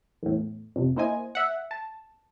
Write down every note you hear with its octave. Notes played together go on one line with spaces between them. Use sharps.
E2 A2
F2 C3
A#3 E4 C5 D#5 G#5
E5 F#5
A5